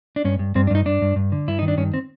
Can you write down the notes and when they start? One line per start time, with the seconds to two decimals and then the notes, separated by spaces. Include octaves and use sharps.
0.16 D4
0.24 G2 C#4
0.39 G2
0.55 G2 C4
0.67 D4
0.70 G2 D#4
0.85 G2 D4
1.02 G2
1.16 G2
1.32 D3
1.48 G2 E4
1.59 D#3 D#4
1.68 D4
1.77 G2 C#4
1.94 C4